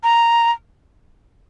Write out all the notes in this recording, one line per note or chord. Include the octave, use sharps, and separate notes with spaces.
A#5